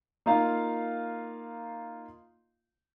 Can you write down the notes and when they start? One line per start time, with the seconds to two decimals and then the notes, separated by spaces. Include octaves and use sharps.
0.26 A#3 D#4 F4 F5